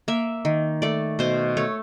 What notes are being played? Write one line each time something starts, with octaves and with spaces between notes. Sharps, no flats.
A#3 E5
D#3
A3 D5
B2 C5
A3 C#5